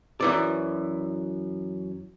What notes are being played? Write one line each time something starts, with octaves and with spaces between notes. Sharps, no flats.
F#2 E3 D5